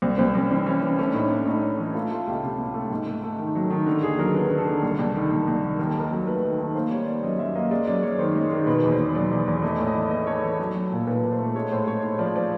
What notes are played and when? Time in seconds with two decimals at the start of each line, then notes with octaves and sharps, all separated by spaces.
0.02 C2 C4
0.18 C2 C4
0.35 C2 C#4
0.51 E3 C4
0.66 E3 C#4
0.82 E3 C#4
0.99 A3 C#4
1.07 D4
1.14 A2 D#4
1.30 A3 D4
1.46 A2 D#4
1.63 A3
1.79 E3
1.94 A3 F4
2.11 A3 F4
2.27 C#2 G4
2.43 C3 G4
2.59 C#2
2.74 A3
2.90 G#2
3.06 A3
3.23 A3
3.39 D#3
3.55 F#3
3.71 D#3
3.86 D3
4.03 D#2 G#4
4.19 F#3 A#4
4.34 D3 B4
4.51 D3
4.58 A4
4.67 D3
4.83 C2
4.99 C2
5.15 D#3
5.31 C2
5.47 C2
5.63 D#3
5.79 D#2 A#4
5.89 A4
5.96 D#2 A#4
6.11 F#3
6.27 A3 B4
6.42 D#3
6.59 D#3
6.75 A#3 C5
6.90 G3 C#5
7.06 G3 D5
7.23 F#2 D#5
7.39 F#2 E5
7.55 A#3 D#5
7.71 G#3 D5
7.87 F#2 D5
8.02 F#2 C#5
8.19 D#3 C5
8.35 G#3
8.51 D#3
8.67 B2 B4
8.83 E2
8.91 C5
8.99 B2
9.15 F#3 D5
9.31 E2
9.48 E2
9.63 A3 D#5
9.80 A2
9.87 D#5
9.95 E3
10.11 A3 D#5
10.27 A3 C#5
10.43 E3 A4
10.59 F#3
10.75 F#3
10.92 A#2
11.07 A#2 B4
11.24 A#2
11.32 C5
11.39 A3
11.55 G#3 C#5
11.72 A2 C5
11.87 G#3 C#5
12.03 A2 C#5
12.19 F3 D5
12.36 F3 D5